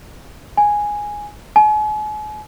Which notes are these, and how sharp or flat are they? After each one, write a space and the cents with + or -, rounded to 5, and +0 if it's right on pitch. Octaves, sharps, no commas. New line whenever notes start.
G#5 +0
G#5 +40